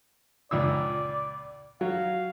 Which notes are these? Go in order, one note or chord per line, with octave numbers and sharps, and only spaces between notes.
C#2 A#2 D5 E6
F#3 F5